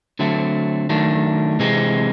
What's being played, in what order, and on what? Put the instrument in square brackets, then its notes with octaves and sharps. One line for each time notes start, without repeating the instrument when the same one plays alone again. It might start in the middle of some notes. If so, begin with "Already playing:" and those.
[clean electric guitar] D3 F#3 A3 C4
D#3 F#3 A3 D4
C3 E3 G#3 C4